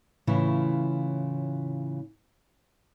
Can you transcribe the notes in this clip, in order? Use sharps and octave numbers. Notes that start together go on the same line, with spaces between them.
A2 C#3 E3 E4 F4